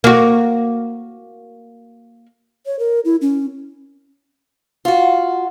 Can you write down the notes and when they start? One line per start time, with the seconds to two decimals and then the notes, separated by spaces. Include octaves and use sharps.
0.04 A#3 F#4
2.66 C#5
2.79 A#4
3.05 E4
3.21 C#4
4.85 F4 F#4